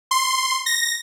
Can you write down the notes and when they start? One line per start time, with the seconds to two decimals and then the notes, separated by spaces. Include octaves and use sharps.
0.11 C6
0.66 A#6